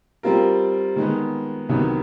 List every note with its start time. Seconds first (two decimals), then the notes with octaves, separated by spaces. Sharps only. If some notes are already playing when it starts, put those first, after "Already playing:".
0.23 G3 C4 F4 A#4
0.96 D#3 G#3 B3
1.69 C2 C3 D#3 F#3 B3